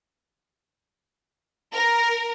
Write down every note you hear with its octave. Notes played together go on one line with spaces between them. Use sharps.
A#4